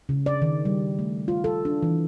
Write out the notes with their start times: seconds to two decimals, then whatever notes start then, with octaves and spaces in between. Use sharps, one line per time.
0.09 C#3
0.26 D5
0.42 D#3
0.65 G3
0.99 A3
1.28 F4
1.44 A4
1.65 D4
1.83 E3